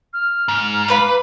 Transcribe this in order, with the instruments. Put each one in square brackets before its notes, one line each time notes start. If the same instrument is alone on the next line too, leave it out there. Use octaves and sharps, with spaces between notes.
[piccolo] F6
[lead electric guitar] G#2
[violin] B4 [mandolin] F5 B5 D6